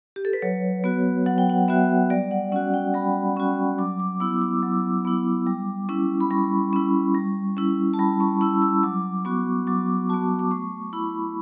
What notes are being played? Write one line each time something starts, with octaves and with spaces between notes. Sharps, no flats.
G4
A4
B4
F#3 C#5
B3 F#4
F#3 F#5
G5
F#5
B3 F#4 E5
G3 D5
F#5
C#4 F#4 F#5
G5
G3 B5
C#4 F#4 C#6
F#3 D6
D6
B3 E4 E6
D6
F#3
B3 E4
G3
C#4 E4
B5
G3 C#6
C#4 E4
G3
C#4 E4
A5
G3 B5
C#6
C#4 E4 E6
E6
F#3 D6
B3 F#4 C#6
F#3 D6
B3 F#4 A5
D6
A3 C#6
E4 B5